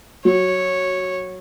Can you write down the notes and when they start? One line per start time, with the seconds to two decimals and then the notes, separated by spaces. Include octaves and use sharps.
0.25 F#3 C#5